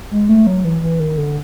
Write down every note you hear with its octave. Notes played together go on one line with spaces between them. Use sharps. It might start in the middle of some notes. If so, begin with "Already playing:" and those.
G#3
A3
F#3
E3
E3
D#3
D3